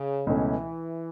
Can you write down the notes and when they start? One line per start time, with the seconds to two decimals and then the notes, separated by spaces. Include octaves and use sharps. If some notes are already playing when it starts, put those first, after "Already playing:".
Already playing: C#3
0.27 C#2 B2 E3 A3 C#4